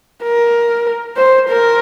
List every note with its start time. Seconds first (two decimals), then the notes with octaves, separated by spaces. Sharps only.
0.24 A#4
1.17 C5
1.49 A#4